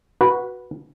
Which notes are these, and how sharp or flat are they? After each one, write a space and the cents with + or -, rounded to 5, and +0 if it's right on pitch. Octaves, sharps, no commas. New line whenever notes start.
F#4 +0 B4 -15